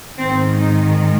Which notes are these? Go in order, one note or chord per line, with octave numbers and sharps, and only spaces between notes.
G#2 D#3 G#3 C4
D#4